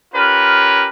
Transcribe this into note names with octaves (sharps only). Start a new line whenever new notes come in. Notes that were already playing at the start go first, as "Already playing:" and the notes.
C#4 F4 G4 A#4 B4